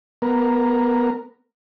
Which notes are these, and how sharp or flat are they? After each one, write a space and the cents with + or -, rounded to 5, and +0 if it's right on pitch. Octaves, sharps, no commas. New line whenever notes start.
B3 +0 A#4 +0